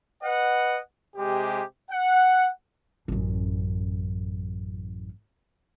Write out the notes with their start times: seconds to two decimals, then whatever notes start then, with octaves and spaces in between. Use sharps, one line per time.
0.24 B4 D#5 F#5
1.16 C3 G#3 G4
1.91 F#5
3.08 A1 F#2